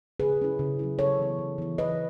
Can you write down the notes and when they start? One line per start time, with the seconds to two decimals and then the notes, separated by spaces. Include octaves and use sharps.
0.20 C#3 G#4 B4
0.40 F#3 C#4 E4
0.59 C#3
0.79 F#3 C#4 E4
0.99 C#3 A4 C#5
1.19 E3 B3 E4
1.39 C#3
1.58 E3 B3 E4
1.78 E3 B4 D#5